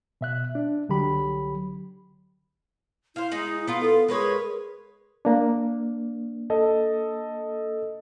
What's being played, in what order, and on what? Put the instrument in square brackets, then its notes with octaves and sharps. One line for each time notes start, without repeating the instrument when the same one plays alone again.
[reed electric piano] B2 E5 F#6
D4
C2 D3 F#3 G4 B5
[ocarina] E4 [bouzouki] C5 F5
[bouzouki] G#3 D#4
B3 F4
[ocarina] A4
[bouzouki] G#3 B4 C#5 [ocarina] A#4
[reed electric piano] A#3 D4
[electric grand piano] A4 D#5 A5